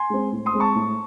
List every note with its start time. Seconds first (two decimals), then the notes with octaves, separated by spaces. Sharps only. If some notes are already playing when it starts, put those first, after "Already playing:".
Already playing: G#5 C6
0.10 G#3 C4
0.32 A2
0.46 C6 D#6
0.53 G#3 C4
0.60 A5 C#6
0.75 A2